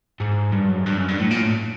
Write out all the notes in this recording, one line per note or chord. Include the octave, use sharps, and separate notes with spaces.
G#2
G2
F#2
G2
F#2
G2
A2
A#2
A2